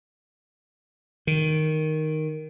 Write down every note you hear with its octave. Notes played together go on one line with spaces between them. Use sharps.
D#3